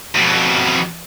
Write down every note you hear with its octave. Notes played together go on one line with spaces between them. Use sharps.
F2 B2